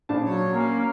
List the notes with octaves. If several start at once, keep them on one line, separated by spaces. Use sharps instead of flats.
A#1 D4 A5
F#3 C#5
A#3 C#4